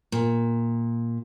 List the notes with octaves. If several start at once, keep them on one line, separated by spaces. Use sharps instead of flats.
A#2